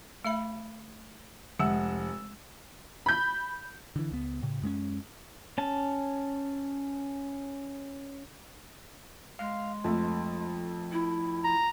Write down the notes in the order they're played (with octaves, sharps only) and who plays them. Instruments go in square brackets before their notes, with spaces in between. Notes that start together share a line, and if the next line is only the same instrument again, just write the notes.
[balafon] A3 E5 B5
[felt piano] F1 F#5 E6 [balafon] G#3
[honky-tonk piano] B5 G6
[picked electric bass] D3 E3
C#2 B3
A2 C#3
F#2 G#3 A#3 C#4
[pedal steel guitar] C#4 A5
[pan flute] G#3 [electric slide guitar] F5
[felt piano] F2 A3 [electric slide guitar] F3
[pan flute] E4
[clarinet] A#5